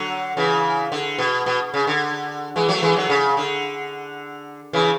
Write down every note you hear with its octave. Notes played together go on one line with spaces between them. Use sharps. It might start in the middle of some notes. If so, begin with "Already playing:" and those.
Already playing: D3 F#3
C#3 E3
D3
B2
B2
C#3
D3
E3 G#3
F#3 A3
E3 G#3
D3 F#3
C#3
D3
C#3 E3